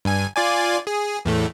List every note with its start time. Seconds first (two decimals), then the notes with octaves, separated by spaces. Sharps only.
0.05 G2 G#5
0.36 F4 D5 G#5
0.87 G#4
1.25 E2 A2 A3